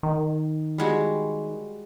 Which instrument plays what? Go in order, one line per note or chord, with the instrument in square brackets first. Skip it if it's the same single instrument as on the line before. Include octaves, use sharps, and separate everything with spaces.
[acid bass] D#3
[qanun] G3 G#3 F#4